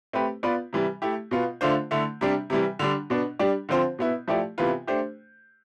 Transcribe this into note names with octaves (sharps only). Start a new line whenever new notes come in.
A3 C4 G4 B4
B3 F4 B4 D5
C3 E3 G3
A3 E4 G4
B2 B3 F4
D3 A3 D4 F4 C5
D3 A3 E4
C3 G3 D4 G4
C3 E3 G3
D3 G3 D4
B2 B3 D4
G3 D4 G4 D5
D3 F3 C4 F4 C5
B2 B3 E4
F3 A3 E4 G4 D5
C3 E3 B3 F4 B4
A3 D4 G4 C5